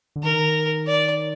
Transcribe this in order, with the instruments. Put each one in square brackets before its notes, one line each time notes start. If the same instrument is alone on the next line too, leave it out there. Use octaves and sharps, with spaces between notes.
[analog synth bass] D3
[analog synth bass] D#3 [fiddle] A#4
[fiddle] D5